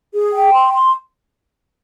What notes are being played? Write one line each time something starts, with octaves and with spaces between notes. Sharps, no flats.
G#4
G5
C6
C6